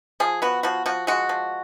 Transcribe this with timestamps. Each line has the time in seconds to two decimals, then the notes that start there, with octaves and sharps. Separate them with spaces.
0.20 F3 G#4
0.42 B3 F#4
0.63 F3 F#4
0.86 F3 F#4
1.07 G#3 F#4
1.29 F3